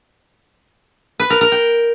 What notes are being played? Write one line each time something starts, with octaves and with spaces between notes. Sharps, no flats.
B4
A#4
A#4
G5